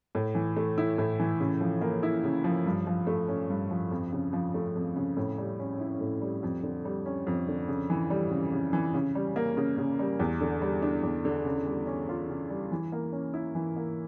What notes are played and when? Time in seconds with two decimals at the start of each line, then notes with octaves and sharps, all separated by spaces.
0.15 A2
0.35 E3
0.57 A3
0.78 E4
0.98 A2
1.19 E3
1.40 C#3
1.61 F3
1.81 A#3
2.03 E4
2.24 C#3
2.44 F3
2.66 G2
2.87 F3
3.07 A3
3.28 C#4
3.50 G2
3.70 F3
3.91 F2
4.13 C#3
4.33 F3
4.54 A3
4.76 F2
4.96 C#3
5.17 A2
5.38 G3
5.59 C#4
5.80 E4
6.00 A2
6.22 G3
6.43 F2
6.63 D3
6.85 G3
7.06 C#4
7.27 F2
7.48 D3
7.68 C#3
7.90 E3
8.10 G3
8.31 C#3
8.52 C#3
8.73 E3
8.94 C#3
9.15 G3
9.36 A#3
9.57 C#3
9.78 C#3
9.99 G3
10.20 E2
10.41 D3
10.61 G3
10.82 D4
11.03 E2
11.25 D3
11.45 C#3
11.67 G3
11.87 C#4
12.09 F4
12.29 C#3
12.50 G3
12.71 E3
12.92 A#3
13.12 C#4
13.34 E4
13.55 E3
13.76 A#3